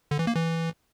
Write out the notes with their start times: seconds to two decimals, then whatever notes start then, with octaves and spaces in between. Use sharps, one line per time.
0.11 D3
0.19 E3
0.27 A#3
0.35 E3